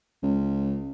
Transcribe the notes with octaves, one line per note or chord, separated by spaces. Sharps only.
C#2